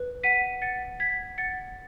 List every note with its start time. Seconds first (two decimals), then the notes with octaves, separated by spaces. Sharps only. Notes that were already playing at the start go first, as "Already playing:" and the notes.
Already playing: B4
0.23 F#5 B6 D#7
0.62 F#5 A6 C#7
1.00 F#5 G#6 B6
1.38 F#5 A6 C#7